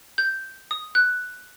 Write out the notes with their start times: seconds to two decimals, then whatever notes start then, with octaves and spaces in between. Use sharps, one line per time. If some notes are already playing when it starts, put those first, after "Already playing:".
0.18 G6
0.71 D#6
0.95 F#6